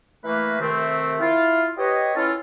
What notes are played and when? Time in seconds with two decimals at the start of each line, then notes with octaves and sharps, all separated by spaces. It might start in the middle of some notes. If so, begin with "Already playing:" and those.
0.25 E3 A3 A#3 B4
0.60 C3 D#3 A3 C4
1.20 E4 F4
1.78 G4 B4 C#5 D#5
2.15 C#4 E4 F4 A4